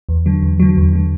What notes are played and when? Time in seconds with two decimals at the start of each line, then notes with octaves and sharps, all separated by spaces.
0.09 E2
0.26 D3 F#3
0.43 E2
0.60 D3 F#3
0.76 E2
0.93 D3 F#3